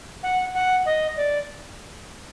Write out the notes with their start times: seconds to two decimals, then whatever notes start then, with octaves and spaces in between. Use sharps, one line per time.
0.23 F#5
0.54 F#5
0.86 D#5
1.17 D5